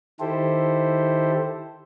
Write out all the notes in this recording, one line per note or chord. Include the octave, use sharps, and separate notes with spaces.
D#3 E4 G4 A4 C5